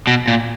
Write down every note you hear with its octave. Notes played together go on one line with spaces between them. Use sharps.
B2
A#2